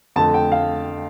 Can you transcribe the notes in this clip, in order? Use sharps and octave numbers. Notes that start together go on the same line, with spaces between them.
F2 D3 A3 A5
G5
F5